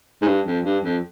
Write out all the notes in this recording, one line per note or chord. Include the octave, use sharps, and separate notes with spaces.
G#2
G2
F2
G2
F2